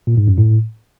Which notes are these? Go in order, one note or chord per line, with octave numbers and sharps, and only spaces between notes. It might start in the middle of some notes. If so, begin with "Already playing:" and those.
A#2
G#2
F#2
A2